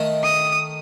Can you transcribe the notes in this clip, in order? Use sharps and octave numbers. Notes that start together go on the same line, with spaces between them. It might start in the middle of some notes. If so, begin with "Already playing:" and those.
Already playing: D#3 A3 D#4
D#6